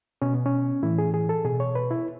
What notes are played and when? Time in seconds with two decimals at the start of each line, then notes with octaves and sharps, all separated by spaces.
0.22 B2 C#4
0.34 B3
0.46 C#4
0.83 A2 E3 E4
0.98 G#4
1.14 G#4
1.29 A4
1.44 B2 G#4
1.60 C#5
1.75 B4
1.91 E4